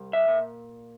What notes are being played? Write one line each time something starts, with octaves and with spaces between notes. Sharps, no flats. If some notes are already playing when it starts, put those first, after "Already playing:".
Already playing: C2
E5
A#2